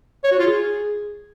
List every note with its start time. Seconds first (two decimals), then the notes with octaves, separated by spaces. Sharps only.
0.24 C#5
0.32 F#4
0.39 F4
0.47 G#4